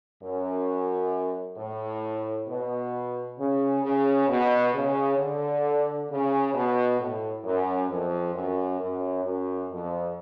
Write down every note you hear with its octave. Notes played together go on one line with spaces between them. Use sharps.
F#2
A2
B2
C#3
C#3
B2
C#3
D3
C#3
B2
A2
F#2
F2
F#2
F#2
F#2
F2